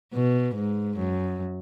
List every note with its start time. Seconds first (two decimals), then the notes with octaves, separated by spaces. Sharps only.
0.13 B2
0.55 G#2
0.98 F#2